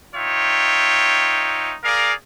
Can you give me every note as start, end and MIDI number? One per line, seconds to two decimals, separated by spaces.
0.15 1.74 63
0.15 1.74 65
0.15 1.74 73
0.15 1.74 76
0.15 1.74 79
1.84 2.13 68
1.84 2.13 70
1.84 2.13 74
1.84 2.13 77